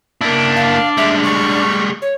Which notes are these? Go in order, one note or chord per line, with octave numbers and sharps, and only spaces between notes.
A#3 D4 E4
F5
G3 G#3 E5
C#6
C#5